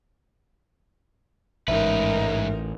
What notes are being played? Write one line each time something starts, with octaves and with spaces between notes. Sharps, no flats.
A1 G#2 D#4 A#4 B4 E5